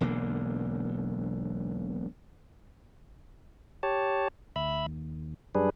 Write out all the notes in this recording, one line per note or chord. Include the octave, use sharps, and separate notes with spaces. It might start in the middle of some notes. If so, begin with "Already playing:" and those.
E1 B1 D3 A#3
G4 C#5 A5
D2 E5 B5
D#2
F#2 G3 D4 G#4 B4